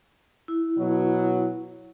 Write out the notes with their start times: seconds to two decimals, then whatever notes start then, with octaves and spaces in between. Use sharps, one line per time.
0.48 E4
0.78 B2 F#3